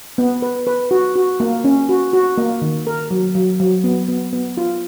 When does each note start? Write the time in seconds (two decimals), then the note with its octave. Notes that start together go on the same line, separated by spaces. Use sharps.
0.18 B3
0.42 B4
0.67 B4
0.91 F#4
1.15 F#4
1.40 A#3
1.64 C#4
1.89 F#4
2.13 F#4
2.38 A#3
2.62 D#3
2.87 A#4
3.11 F#3
3.35 F#3
3.60 F#3
3.84 B3
4.08 B3
4.33 B3
4.57 F4